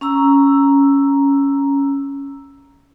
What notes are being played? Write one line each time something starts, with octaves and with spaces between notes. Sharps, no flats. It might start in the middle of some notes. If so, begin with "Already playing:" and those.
C#4 A#5 E6